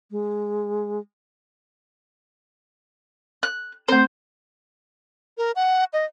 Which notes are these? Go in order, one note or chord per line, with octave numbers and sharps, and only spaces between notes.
G#3
F#6
A3 C4 C5
A#4
F#5
D#5